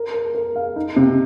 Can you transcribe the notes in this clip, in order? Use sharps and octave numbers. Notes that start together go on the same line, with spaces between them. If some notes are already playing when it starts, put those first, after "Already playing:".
Already playing: A#4
A#4
A#4
F5
D#4
C3